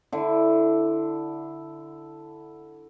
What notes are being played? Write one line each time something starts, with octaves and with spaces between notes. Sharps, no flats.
D3 E4